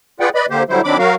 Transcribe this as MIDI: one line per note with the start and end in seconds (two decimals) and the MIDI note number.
0.20 0.29 65
0.20 0.29 68
0.20 0.29 71
0.20 0.29 74
0.20 0.29 78
0.20 0.29 79
0.35 0.46 71
0.35 0.46 74
0.35 0.46 75
0.35 0.46 83
0.50 0.63 50
0.50 0.63 58
0.50 0.63 67
0.50 0.63 72
0.69 0.81 50
0.69 0.81 54
0.69 0.81 55
0.69 0.81 64
0.69 0.81 72
0.84 0.97 51
0.84 0.97 54
0.84 0.97 60
0.84 0.97 62
0.84 0.97 83
0.84 0.97 86
0.99 1.15 54
0.99 1.15 66
0.99 1.15 70
0.99 1.15 77